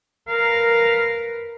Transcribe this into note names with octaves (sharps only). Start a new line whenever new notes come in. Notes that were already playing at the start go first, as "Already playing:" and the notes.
A#4 B4 F5